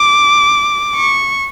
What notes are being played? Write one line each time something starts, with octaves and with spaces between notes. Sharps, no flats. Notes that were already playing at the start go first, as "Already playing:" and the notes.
Already playing: D6
C#6